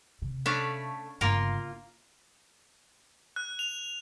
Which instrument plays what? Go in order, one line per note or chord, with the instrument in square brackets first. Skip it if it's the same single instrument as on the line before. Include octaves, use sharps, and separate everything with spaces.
[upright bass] C3
[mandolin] A3 B5 [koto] C#4 D4 F5
[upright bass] G1 C#3 [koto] A#3 A#4 [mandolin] F4
[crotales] F#6
F7